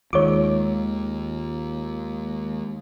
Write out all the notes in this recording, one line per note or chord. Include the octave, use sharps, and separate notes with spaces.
D#2 D#3 G#3 F4 C#5 D6